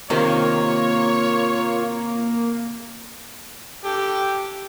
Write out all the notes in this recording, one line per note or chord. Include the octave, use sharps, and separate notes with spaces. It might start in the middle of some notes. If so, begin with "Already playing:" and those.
C3 D#3 A#3 F4 C#5
G4 A4